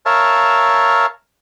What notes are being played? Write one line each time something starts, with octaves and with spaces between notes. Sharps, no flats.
A#4 C#5 E5 F5 A5